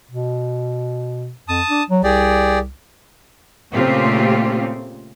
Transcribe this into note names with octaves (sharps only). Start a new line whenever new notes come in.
B2
F2 A5 D#6
D4
F#3
C2 G4 G#4 D5
A#2 C#3 A3 C4 F4 G4